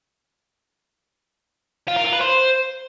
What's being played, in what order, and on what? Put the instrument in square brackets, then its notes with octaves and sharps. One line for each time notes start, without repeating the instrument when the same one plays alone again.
[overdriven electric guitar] F4
A#4
F4
B4
C5